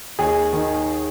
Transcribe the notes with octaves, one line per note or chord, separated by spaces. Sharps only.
D#2 G#4
D#3